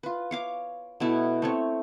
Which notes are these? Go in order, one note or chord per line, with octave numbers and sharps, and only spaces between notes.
F4 B4
C#5 F5 D6
B2 A3 E4
A3 C4 C#5